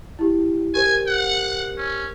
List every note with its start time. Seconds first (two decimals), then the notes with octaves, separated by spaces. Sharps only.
0.19 E4 G4
0.74 G4 A#4 C5 G#5
1.07 F#5
1.78 C#4